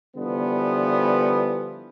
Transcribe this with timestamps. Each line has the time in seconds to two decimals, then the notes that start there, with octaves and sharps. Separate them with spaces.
0.16 D3 E3 F3 G3 B3